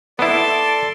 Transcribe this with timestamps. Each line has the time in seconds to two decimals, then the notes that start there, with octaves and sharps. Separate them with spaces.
0.19 B3 E4 A4 D5 A5 C6